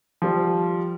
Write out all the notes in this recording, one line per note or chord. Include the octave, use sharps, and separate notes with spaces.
F3 G3